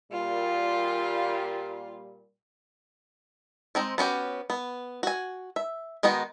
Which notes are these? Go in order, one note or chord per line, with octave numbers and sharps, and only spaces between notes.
A#2 G3 F4
G#3 C4 D#4
B3 C#4 F#4 G4
B3
F#4 G#5
E5
D#3 G#3 B3 D#4 F#4